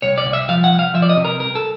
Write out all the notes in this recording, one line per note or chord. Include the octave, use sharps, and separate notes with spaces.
C2 C#5
D5
C2
E5
F3 F5
F#5
C2
F5
F3 E5
D5
D#5
C3
A#4
C2 A#4
A4